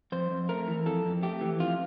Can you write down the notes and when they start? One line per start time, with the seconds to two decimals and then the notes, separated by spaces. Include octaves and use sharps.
0.12 F2 C5
0.31 F2
0.49 A3 A#4
0.68 E3
0.86 F2 A4
1.05 F2
1.23 A3 G4
1.41 E3
1.60 F2 F4